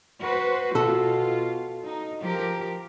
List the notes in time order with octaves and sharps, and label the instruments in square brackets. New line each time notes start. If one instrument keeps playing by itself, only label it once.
[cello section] F#4 B4 C5
[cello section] B2 F4 [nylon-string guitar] F#4 A4
[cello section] D#4
F3 G4 A#4